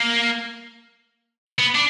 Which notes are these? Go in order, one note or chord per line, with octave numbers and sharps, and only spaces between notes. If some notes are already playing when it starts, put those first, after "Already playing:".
Already playing: A#3
B3
D4